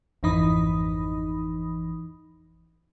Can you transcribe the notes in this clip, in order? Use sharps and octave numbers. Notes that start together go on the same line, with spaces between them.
G#1 F2 E3 D#4 B5 D#6